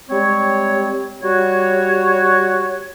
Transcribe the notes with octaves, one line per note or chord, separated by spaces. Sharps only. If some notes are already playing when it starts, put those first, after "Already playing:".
G3 G#3 C4 C#5
G3 F#4 C#5